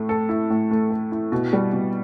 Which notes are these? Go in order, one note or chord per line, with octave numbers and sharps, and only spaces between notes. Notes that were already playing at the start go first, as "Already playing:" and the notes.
Already playing: A2 A3
A4
E4
A2
A3
A4
E4
B2
G3
B2